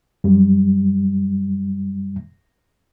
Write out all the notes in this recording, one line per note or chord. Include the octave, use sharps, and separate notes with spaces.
F#2 G3